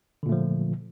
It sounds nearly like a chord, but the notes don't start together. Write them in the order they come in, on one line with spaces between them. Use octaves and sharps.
D3 A#2 A3 F3